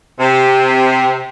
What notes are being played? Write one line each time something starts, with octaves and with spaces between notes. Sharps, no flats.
C3